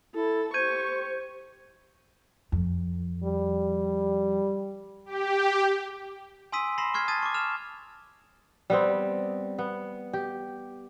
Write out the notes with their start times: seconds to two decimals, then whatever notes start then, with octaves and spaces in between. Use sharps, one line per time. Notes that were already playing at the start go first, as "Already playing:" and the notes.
0.15 E4 A4
0.54 G4 C5 C#6 G6 G#6 D#7
2.52 F2
3.24 G3
5.06 G4
6.52 G#5 C6 D#6 E6 B6 D#7
6.78 B5 C6 A#6 C7 E7
6.94 C#6 F6 G#6 C7
7.08 A5 C#6 D#6 G#6 A6 D#7
7.23 C#6 D6
7.34 F6 E7 F7
8.70 G3 B3 C4
9.59 B3
10.13 G4